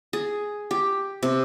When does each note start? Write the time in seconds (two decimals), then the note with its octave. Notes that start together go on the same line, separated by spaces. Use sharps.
0.13 G#4
0.71 G4
1.23 C3